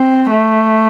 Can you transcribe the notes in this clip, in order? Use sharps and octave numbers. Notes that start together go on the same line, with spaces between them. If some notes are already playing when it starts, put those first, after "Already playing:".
Already playing: C4
A3